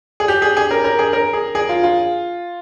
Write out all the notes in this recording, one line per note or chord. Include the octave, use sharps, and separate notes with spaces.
G#4
G4
G#4
G#4
A#4
A#4
G#4
A#4
G#4
G#4
F4
F4